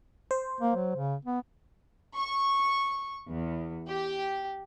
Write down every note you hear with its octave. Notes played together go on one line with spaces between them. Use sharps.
C5
A#3
F#3
C#3
B3
C#6
E2
G4